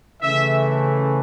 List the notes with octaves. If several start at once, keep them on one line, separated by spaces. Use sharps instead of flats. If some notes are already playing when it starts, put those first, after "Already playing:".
C#3 E3 A3 C#4 E5